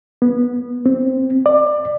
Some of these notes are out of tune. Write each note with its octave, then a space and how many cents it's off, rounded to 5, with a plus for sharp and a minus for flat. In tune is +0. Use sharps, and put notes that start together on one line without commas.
B3 -15
C4 +0
D5 +25